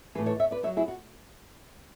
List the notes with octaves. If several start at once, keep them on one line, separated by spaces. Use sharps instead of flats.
A2 E3 G#4 B4
A4 C#5
C#5 E5
B4 D5
A2 C#5 E5
F#3
E4 G#4
F#4